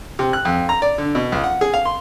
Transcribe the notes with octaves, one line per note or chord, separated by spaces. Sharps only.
C3
F#6
F2
A#5
D5
D3
B2
C#2
F#5
G#4
F5
C6